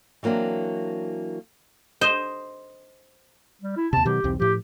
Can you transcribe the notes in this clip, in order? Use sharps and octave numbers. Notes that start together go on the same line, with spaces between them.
E3 F#3 A#3 C4 D4
C5 D#5
G3
E4
D#2 C3 A5
B2 D#3 F#3 G4
B1 E2 C4
A2 F3 G4